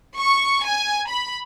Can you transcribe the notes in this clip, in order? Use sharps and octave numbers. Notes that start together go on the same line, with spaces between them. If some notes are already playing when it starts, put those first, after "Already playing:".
C#6
G#5
B5